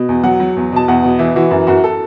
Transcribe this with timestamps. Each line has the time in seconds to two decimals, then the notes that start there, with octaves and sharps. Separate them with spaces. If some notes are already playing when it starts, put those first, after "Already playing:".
Already playing: B2
0.09 E2
0.24 F#3 F#5
0.40 F#3
0.57 E2
0.72 B2 A5
0.88 E2 F#5
1.03 B2
1.19 E3 E4
1.36 E3 F#4
1.51 F#2
1.67 F#2 F#4
1.84 A4